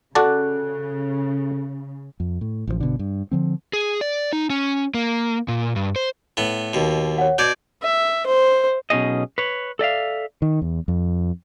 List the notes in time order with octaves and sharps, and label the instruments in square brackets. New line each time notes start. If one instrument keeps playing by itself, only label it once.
[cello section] C#3 [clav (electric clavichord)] F#4 D5 A5 [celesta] A4 F#6
[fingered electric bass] F2
A2
A1 D#3 F3
G1 B2 D3
G2
D3 F3 C4
[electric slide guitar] G#4
D5
D#4
C#4
A#3
A#2
G2
C5
[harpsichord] A2 B3
D#2 B2
[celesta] C#5 F#5
[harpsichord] B2 D5 [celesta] G6 G#6 D7
[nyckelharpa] E5
C5
[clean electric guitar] B1 B2 C#4 D#4 G#4 D#5
B4 C#5
A4 D5 E5 F5
[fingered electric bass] D#3
E2
F2